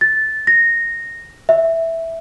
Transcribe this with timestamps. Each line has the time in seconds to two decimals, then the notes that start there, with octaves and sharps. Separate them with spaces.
0.01 A6
0.47 A#6
1.49 E5